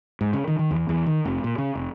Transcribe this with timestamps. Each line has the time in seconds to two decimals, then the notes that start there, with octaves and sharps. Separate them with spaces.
0.21 G#2
0.33 C#3
0.48 D#3
0.59 D#3
0.71 E2
0.89 E2
1.06 D#3
1.25 F1
1.44 A#2
1.58 C#3
1.75 F1